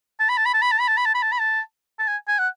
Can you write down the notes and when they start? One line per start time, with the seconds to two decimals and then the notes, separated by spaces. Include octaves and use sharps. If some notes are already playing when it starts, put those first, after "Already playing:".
0.20 A5
0.29 B5
0.37 A5
0.46 B5
0.54 A5
0.62 B5
0.72 A5
0.80 B5
0.88 A5
0.97 B5
1.05 A5
1.15 B5
1.23 A5
1.32 B5
1.40 A5
1.99 A5
2.07 G#5
2.28 G#5
2.39 F#5